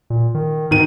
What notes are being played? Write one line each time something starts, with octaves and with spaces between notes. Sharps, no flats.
A#2
D#3
G#2 D#3 D#7